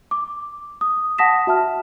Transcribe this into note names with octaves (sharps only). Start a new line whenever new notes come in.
D6
D#6
F#5 A5 D#6 A#6 B6 E7
F#4 E5 A5 F6